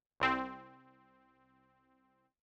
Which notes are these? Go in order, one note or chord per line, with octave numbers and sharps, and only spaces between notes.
C2 C4